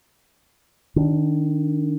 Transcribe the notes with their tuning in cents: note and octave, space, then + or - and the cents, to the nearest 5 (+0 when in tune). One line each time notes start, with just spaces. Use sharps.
D#3 -15 D4 -40